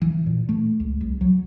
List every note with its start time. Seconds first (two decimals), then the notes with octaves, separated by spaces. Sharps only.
0.02 E3
0.26 A#2
0.49 A3
0.80 C#2
1.01 C2
1.21 F#3